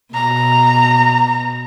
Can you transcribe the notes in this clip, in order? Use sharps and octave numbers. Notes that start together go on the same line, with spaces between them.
B2 A#5